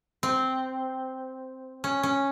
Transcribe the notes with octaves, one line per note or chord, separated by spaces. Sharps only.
C4
C#4
C#4